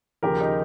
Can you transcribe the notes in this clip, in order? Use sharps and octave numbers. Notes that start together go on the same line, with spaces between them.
D#2 C#3 F3 G4 A#4
D#4